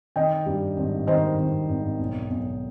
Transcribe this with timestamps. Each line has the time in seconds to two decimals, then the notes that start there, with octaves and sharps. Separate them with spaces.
0.16 D#3 D#5 G5
0.46 G2
0.77 G#1
1.07 D#3 C5 D#5
1.38 D#3
1.69 G#1
1.99 B1
2.30 B1